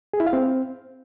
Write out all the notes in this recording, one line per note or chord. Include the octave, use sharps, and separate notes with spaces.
G#4
E4
F5
C4